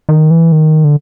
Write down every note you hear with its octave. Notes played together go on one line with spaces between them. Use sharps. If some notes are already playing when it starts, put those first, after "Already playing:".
D#3
E3
D#3
D3